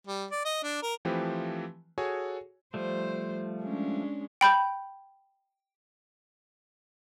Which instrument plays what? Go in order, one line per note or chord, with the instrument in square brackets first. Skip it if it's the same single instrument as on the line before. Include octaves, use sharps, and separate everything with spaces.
[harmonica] G3
D5
D#5
D4
A#4
[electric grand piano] E3 F3 A3 C4 G4 B4
F#4 G#4 A4 C#5 G#5
[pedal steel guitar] F3 G3 A3 [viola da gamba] C5
[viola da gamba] G#3 C#4 D4
[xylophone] G5 B5 G6